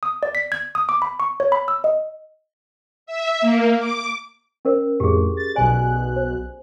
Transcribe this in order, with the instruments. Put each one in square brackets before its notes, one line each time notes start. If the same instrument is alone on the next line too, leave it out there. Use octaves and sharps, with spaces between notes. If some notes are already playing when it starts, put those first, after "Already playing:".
[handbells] D#6
D5
B6
G#6
D#6
D6
B5
C#6
C#5
B5
E6
D#5
[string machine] E5
A#3
D6
[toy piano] C#4 A#4 C5
[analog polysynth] F2 A2 [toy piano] G4 G#4
[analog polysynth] A6
[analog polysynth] B1 B2 F#6 [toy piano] D5 G#5
[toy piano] C5